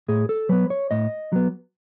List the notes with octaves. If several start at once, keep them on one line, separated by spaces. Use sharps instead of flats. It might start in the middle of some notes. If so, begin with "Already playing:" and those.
A2 G#4
A4
F#3 B3 B4
C#5
A2 D#5
F#3 B3